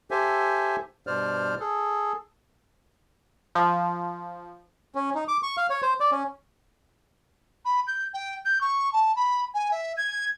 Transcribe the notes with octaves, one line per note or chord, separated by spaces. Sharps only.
G4 A4 C5 E5 G#5
G2 B2 C5 D5 F6
G#4 A4
F3
C#4
D#4
D6
C#6
F5
C#5
C5
D5
C#4
B5
G6
G5
G6
C#6
A5
B5
G#5
E5
G#6